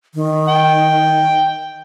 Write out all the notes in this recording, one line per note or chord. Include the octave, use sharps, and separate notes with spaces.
D#3
G5